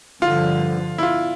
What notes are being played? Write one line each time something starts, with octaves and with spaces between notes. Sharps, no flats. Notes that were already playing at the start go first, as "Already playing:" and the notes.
G2 D3 F3 F4
E4
F4